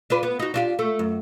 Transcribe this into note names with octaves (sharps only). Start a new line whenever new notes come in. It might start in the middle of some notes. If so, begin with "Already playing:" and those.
D4 F4 B4
B3
D#4 F#4
D4 F4 G4
A3
F#2